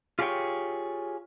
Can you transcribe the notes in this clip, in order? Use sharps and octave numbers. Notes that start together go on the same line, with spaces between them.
F4 G4 G#4 A#4 C#5 G5